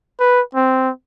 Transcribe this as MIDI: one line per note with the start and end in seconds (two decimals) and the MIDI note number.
0.19 0.41 71
0.55 0.90 60